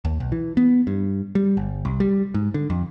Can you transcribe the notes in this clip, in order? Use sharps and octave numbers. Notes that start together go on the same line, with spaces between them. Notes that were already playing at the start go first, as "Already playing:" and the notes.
D#2
B1
E3
B3
G2
G3
G1
C2
G3
G#2
D3
F2